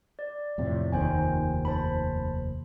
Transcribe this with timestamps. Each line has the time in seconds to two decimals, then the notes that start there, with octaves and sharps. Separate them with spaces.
0.19 D5
0.58 F2 A2 C3
0.92 F1 D#2 D#3 C5 G5 G#5
1.65 C5 A5 B5